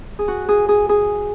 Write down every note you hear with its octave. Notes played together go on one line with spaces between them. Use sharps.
G#4
F#4
G#4
G#4
G#4